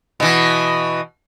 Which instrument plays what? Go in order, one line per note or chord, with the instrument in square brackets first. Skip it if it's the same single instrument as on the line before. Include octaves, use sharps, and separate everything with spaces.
[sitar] B2 E3